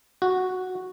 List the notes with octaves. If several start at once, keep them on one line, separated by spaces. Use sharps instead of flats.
F#4